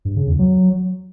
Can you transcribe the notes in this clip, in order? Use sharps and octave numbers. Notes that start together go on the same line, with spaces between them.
G2
C#3
E2
F#3